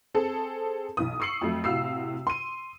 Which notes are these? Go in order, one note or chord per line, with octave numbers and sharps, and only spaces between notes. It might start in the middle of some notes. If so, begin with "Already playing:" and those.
C4 G#4 A4
B1 E3 D#6
C#6 E6 C7 C#7 F#7
F2 F#3 A3
A2 C3 F#4 F5 E6 C7
C6 D#7